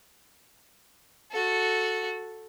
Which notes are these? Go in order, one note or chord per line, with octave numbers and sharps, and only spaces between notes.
F#4 A4